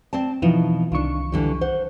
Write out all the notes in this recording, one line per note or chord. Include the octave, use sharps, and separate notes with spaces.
C4 D5 A5
B2 E3 F3 D#4
C2 D#3 D4 F4 C#6
D3 E3 G3
C5 F#5